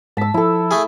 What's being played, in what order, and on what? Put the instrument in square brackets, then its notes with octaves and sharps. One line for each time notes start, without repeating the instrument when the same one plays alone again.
[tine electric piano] G#2 G#3 B6 [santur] A5 E6
[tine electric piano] F3 [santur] E4 A4
[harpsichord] A3 G#4